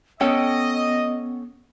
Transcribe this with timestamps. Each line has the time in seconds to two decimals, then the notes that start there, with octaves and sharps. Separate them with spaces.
0.21 B3 C#4 A4 D#5 G5